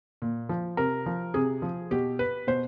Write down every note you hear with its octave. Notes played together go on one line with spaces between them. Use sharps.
A#2
F3
C3 A#4
F3
C3 G#4
F3
B2 G4
B4
B2 C5